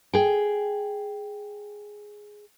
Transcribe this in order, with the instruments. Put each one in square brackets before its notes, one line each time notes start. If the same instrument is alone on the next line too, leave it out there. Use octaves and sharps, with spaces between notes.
[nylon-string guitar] G#4 G5